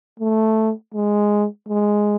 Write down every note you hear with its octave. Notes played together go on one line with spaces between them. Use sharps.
A3
G#3
G#3